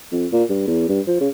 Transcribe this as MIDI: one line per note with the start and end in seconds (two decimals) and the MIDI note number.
0.12 0.26 41
0.32 0.43 46
0.50 0.67 43
0.67 0.86 40
0.89 1.00 43
1.07 1.16 53
1.20 1.28 49